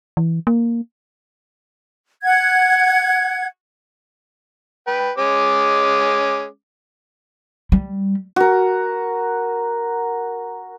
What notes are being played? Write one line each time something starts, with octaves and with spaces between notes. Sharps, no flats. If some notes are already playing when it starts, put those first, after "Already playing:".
E3
A#3
F#5 G#6
B4 G5
G#3 C#4 D6
G3
F#4 A#4